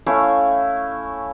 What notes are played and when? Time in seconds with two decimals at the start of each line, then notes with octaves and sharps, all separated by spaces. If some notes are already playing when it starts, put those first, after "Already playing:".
0.06 A3 C#4 E4 F5